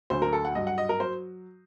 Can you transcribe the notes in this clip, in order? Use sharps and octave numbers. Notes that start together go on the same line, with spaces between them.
D2 D3 F#3 C5
A#4
A4
F#5
G2 F#3 D#5
F#5
D#5
A#4
F#3 C5